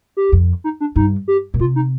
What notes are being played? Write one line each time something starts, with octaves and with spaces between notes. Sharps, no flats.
G4
F2
D#4
D4
G2 D#4
G4
A#2
C3 F4
D#4